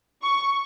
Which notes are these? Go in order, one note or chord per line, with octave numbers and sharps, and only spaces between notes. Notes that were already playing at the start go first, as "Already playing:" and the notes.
C#6